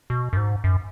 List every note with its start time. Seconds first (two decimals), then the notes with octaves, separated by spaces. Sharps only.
0.10 B2
0.33 F#2
0.37 G#2
0.64 F#2